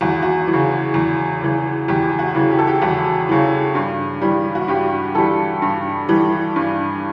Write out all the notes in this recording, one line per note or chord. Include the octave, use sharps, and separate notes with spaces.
E2 F#4
F#4
E3
C#3
E2
C#3 E3
E2 G4
F#4
C#3 E3
G4
A4
G4
E2 F#4
C#3 E3
G2
E3 G3
F#4
G2 G4
E3 G3 A4
G2
E3 G3
G2